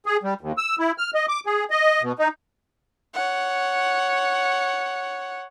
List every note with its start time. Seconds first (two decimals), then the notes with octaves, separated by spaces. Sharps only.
0.06 G#4
0.23 G3
0.41 D#2
0.58 E6
0.79 E4
0.98 F6
1.15 D#5
1.29 D6
1.46 G#4
1.71 D#5
2.02 B2
2.19 D#4
3.14 C#5 F#5